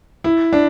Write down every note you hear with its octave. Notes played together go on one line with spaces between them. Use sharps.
E4
D4